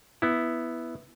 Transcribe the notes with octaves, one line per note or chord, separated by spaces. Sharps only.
B3 E4